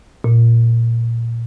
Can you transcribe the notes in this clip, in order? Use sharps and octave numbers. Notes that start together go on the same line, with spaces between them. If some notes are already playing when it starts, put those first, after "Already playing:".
A#2